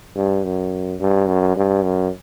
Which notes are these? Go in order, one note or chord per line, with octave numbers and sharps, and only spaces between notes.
G2
F#2
G2
F#2
G2
F#2